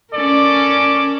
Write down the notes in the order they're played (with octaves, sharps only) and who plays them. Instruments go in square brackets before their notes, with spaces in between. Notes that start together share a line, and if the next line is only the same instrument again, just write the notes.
[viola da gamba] C#4 A#4 [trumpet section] A4 D5